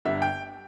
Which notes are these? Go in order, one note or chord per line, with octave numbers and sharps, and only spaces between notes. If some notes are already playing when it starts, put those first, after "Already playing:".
G1 G2 D3 E5
G5